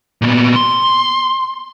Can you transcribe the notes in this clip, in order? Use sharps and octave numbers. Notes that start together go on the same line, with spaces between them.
A#2 B3
C6